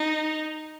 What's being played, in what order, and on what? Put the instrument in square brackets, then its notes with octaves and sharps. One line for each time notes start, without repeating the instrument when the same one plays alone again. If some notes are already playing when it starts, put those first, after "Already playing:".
Already playing: [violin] D#4